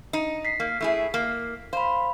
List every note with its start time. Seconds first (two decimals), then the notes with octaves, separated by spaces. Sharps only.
0.13 D#4
0.45 B6 C7
0.60 A#3
0.81 A3 E4 G#4
1.14 A#3
1.73 C5 F5 B5